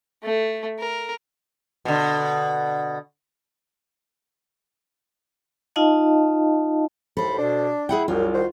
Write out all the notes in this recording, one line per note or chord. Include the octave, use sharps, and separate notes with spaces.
A3
A#4
B2 D3
D#4 F4 D#5 F5 A5
D#2 A2 A4 C5 B5
B2 D4
E4 G#4 F#5 G5
C2 F#2 F4
D#3 F#4 C5